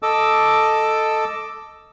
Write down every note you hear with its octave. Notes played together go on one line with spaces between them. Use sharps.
A4 D#5 D6 E6